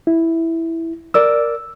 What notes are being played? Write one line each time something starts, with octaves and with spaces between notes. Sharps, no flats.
E4
A#4 D5 E6